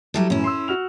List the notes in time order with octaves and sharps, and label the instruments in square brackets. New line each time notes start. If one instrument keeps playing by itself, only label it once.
[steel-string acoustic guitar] F#3 G3 A4 [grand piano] E4 G4
[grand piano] F#2 A2 E3 [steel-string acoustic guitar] C#4 E4
[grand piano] C6 E6
F#4 F6 F7